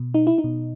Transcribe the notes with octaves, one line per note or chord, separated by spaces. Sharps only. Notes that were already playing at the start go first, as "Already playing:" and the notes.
Already playing: B2
D#4
E4
D#4
B2